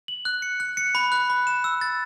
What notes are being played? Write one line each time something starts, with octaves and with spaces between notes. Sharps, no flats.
F#7
F#6
C#7
F#6
C#7
B5
F#6
B5
E7
E6
A6